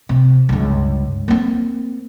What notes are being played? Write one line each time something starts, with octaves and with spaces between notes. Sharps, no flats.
C3
C#2 G2
A#3 C4